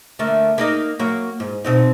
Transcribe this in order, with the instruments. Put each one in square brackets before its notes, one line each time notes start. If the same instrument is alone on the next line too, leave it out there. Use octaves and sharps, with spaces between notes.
[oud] D3 A3 A#3
A#3 D#4 D#5
F#3 A#3
G#2
B2 C4 D#4